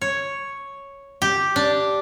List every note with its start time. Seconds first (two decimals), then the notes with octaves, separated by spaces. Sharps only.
0.01 C#5
1.22 G4
1.56 D4